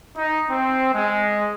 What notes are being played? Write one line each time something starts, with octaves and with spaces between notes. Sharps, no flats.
D#4
C4
G#3